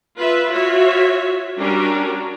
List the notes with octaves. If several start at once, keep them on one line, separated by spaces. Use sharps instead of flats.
F4 B4 E5
F4 F#4 C#5 E5
G3 C#4 D4 F#4 A#4